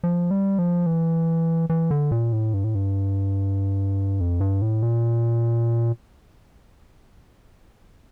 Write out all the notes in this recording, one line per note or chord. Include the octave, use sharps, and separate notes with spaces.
F3
G3
F3
E3
E3
D3
A#2
A2
G2
A2
G2
F2
G2
A2
A#2